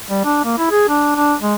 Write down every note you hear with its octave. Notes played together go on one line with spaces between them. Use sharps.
G3
D4
A#3
E4
G#4
D4
D4
G#3